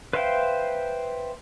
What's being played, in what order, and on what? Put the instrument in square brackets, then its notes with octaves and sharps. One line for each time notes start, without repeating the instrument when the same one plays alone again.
[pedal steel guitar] B4 C5 E5 F5 G5